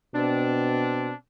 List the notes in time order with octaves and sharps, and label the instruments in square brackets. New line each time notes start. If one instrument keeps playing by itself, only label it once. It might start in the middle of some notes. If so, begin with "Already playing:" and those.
[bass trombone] B2 [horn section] C4 D4